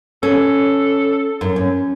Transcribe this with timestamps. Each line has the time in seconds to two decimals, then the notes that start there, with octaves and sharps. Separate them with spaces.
0.23 C#4 A4
1.41 F#2
1.56 C#4